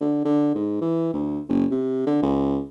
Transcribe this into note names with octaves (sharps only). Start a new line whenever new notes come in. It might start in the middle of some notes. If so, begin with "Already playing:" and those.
D3
D3
G#2
E3
D2
F#1
C3
D3
C#2